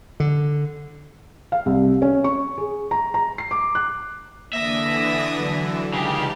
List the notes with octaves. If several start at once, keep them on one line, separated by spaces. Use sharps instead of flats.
D3
F5
C2
C#4
C#6
G#4
A#5
A#5
C7
D6
F#6
D3 E3 A#3 D5 E5 D#6 A#6
F#3
C#2 C#3 D#4 G4 F5 A5